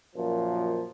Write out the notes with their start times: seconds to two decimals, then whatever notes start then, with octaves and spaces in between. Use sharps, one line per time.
0.15 F#2 A#2 F3